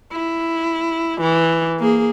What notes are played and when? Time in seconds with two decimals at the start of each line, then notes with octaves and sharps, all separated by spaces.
0.12 E4
1.21 E3
1.79 A#3 G#4